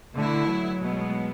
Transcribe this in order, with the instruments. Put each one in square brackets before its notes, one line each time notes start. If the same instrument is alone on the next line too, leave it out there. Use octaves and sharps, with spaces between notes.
[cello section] B2 A3 E4 [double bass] D3
[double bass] F#3
[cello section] B2 G#3 B3